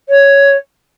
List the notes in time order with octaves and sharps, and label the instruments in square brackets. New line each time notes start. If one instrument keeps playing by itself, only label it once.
[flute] C#5